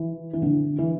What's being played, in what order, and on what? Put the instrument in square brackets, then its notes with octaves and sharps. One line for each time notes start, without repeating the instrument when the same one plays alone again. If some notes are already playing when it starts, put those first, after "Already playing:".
Already playing: [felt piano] E3
E3
D3
E3